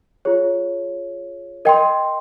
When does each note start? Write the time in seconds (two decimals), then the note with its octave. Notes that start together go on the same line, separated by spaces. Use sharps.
0.25 F4 G#4 C#5
1.65 A#4 D#5 G5 C6